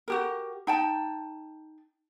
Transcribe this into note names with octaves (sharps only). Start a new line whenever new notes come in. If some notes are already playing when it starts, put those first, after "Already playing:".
F#4 G4 A#4
D#4 G5 A5